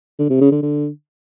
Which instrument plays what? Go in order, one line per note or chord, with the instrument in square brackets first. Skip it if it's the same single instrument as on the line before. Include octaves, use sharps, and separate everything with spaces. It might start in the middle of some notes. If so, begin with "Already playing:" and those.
[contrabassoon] D3
C3
C#3
D3
D3